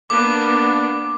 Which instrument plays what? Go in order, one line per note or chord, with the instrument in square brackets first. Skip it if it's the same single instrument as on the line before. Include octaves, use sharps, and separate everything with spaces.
[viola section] A#3 B3 D4 [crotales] D6